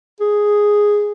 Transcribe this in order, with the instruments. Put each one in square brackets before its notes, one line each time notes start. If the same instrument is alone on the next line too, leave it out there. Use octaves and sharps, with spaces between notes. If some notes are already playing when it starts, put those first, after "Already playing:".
[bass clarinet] G#4